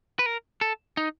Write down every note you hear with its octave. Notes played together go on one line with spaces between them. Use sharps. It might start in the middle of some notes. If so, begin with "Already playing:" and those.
B4
A#4
A4
D#4